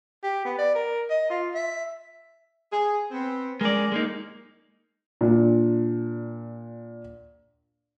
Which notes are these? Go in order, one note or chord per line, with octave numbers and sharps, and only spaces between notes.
G4
B3
D5
A#4
D#5
F4
E5
G#4
B3 C4
G#3 C#4 A#4 D5
G#3 A#3 D#4
A#2 D4